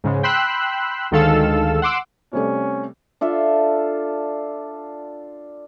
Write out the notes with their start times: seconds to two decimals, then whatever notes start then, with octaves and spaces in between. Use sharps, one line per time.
0.04 G#2 C#3 G#3
0.23 G5 B5 C6 E6 F#6
1.11 D2 D#3 G#3 A4 F5 E6
1.82 F#5 C6 D6 E6
2.33 C3 G3 A3 C#4
3.21 D4 F4 A4 E5